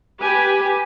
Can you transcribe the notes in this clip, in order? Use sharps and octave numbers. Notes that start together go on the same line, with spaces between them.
G4 B4 G#5